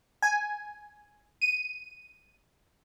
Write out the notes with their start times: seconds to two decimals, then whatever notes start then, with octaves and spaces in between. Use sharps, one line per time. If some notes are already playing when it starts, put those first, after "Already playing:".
0.22 G#5
1.42 D#7